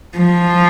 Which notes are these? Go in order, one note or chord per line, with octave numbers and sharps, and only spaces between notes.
F3